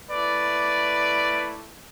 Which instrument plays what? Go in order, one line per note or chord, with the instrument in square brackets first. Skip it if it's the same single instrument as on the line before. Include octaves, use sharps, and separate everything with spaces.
[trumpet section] A3 E4 B4 D5